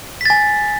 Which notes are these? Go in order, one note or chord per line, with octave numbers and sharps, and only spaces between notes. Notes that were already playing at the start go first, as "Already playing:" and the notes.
G#5 A6 B6